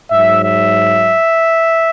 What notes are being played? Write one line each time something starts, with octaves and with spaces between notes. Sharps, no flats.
G#2 F#3 E5
E5